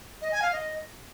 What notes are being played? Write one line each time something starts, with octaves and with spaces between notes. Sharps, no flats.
D#5
G#5
F5
D#5